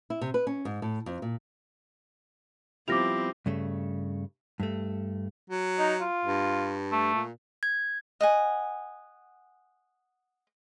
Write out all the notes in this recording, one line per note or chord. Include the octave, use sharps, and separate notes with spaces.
E4
C3
B4
C#4
G#2
A2
F2
A#2
F3 G3 B3 C4 E4 D6 A#6 F7
G2 C#3 A3
G2 A3
F#3
D#4
F4
G2
A3
A#2
G#6
D#5 F#5 G#5